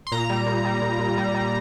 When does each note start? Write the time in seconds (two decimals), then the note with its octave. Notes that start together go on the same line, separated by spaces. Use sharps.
0.07 C6
0.12 A#2 A#5
0.29 G3
0.46 A#2
0.65 G3
0.82 A#2
0.99 A#2
1.18 G3
1.35 G3